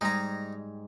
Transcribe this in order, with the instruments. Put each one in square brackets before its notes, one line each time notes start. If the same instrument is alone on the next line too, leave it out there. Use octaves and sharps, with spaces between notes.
[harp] G#2 G3 G#3 [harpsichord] D#4 A#5